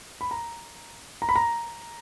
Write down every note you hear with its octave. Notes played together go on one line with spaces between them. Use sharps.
B5
A#5
A#5
B5
A#5